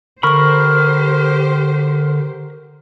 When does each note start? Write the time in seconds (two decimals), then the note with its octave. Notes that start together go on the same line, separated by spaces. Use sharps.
0.23 D3 G4 A#4 C5 B5 C#6 F6